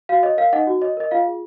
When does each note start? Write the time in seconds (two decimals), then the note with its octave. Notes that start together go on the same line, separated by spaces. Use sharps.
0.09 F#4 F5
0.23 C#5 D#5
0.37 A#4 F5
0.53 D#4 D#5 F#5
0.67 F#4
0.82 C#5 D#5
0.97 A#4 D#5
1.11 F4 F5
1.26 G#4